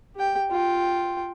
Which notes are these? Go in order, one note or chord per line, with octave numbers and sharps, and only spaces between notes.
G4 G5
F4 G5